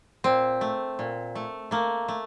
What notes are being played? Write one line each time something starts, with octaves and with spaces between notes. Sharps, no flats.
A#2 C4
A3
A#2
A3
A3 A#3
A3